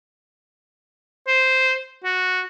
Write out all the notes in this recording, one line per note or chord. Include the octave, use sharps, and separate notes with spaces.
C5
F#4